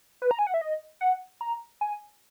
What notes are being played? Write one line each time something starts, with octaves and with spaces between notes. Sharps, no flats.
B4
A#5
G#5
F#5
E5
D#5
F#5
A#5
G#5